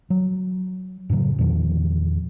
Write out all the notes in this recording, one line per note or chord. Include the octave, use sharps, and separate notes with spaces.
F#3
F#2 A2 C#3 F#3
E2 A#2 D#3 F3